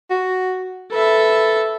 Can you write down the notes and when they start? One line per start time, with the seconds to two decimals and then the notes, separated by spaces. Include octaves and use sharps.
0.10 F#4
0.92 A4 B4 E5